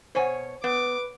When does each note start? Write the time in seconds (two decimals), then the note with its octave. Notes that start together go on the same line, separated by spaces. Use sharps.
0.15 B2 C5 C#5 F#5 G#5
0.64 B3 B4 D6